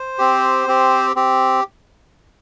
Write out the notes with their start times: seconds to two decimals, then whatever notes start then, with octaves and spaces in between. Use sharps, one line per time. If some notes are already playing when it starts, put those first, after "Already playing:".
Already playing: C5
0.19 C4 G4
0.67 C4 G4
1.16 C4 G4